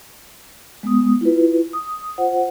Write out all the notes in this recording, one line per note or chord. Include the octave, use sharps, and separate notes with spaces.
G#3 B3 D#6
E4 F4 B4
D#6
F4 C5 F#5